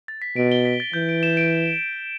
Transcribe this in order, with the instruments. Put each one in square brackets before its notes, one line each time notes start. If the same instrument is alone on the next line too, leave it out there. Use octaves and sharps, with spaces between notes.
[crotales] A6
B6
[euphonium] B2 [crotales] D7
[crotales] G7
B6
A6
[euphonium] E3 [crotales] G6
[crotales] D7
E7
D7